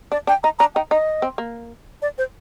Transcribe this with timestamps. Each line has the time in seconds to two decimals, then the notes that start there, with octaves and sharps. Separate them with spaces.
0.12 D4 D5
0.27 D4 G5
0.44 D#4 A#5
0.59 D4 A#5
0.75 D#4 G5
0.91 D#4 D#5
1.22 C4
1.38 A#3
2.02 D5
2.18 C5